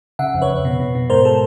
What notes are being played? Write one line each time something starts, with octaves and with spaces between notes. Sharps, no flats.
C#3 E5 F#5
F2
B4 C#5
F2
B2
B2
B2
G#2 A#4 C5
A4